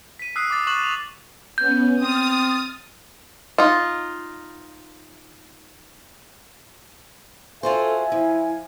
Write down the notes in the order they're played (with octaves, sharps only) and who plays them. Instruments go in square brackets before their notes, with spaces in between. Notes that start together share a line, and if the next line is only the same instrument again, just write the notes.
[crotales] B6 D#7
D#6 E6 F#6 C7
D6 A6
C#6 D#6 F#6 A6 E7 F#7
F7
[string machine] B3 C#4 [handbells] G6
[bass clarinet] C4 [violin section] D#6 [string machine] F6 A6
[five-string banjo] D#4 F4
[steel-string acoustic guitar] F4 F#4 C5 [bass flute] A4 [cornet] E5 [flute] G#5
[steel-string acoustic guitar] F3 [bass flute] E4